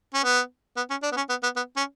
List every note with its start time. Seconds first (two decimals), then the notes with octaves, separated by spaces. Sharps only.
0.14 C#4
0.24 B3
0.76 B3
0.90 C#4
1.02 D4
1.12 B3
1.16 C#4
1.29 B3
1.43 B3
1.56 B3
1.76 C#4